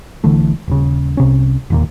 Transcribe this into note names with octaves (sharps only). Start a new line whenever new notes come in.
B1 D3 E3 A3
D#1 C#3
C2 C3 C#4
E1 D#2 A#2